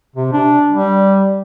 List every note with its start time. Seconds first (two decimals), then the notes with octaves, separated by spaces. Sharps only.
0.16 C3
0.32 D4
0.72 G3